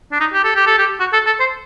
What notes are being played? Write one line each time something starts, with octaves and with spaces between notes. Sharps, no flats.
D4
D#4
G4
A4
G4
A4
G4
F#4
A4
A4
C5